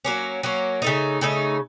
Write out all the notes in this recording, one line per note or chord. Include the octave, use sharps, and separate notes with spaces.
F#3 A#3 C#4
F#3 A#3 C#4
C#3 A3 D#4
C#3 A3 D#4